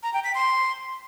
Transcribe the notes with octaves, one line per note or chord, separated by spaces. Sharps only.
A#5
G5
B6
C6